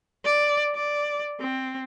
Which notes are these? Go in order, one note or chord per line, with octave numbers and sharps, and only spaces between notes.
D5
D5
C4